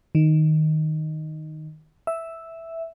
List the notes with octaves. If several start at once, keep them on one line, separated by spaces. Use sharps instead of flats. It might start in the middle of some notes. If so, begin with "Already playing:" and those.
D#3
E5